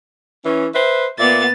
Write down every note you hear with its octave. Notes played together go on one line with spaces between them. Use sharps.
E3 C#4
B4 C5 E5
A#2 B3 D5 E5 A6